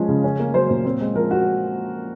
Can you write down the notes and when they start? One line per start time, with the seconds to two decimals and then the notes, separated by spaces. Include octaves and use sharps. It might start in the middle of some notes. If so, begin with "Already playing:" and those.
Already playing: F3 G#3 C#4
0.08 C#3
0.24 C#4
0.39 A#3
0.54 F#3 C5
0.70 A#2
0.85 C4
1.01 G#3
1.15 F3 A#4
1.31 F#4